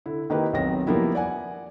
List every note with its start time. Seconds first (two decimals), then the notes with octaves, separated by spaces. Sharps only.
0.06 D3 E4
0.30 D#3 A#3 D#4 E4 G4 B4
0.53 B1 D#3 F#3 C4 A#6
0.87 F3 G3 A#3 B3 E4
1.15 D5 F#5 G#5